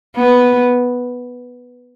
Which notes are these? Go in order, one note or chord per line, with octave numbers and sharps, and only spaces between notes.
B3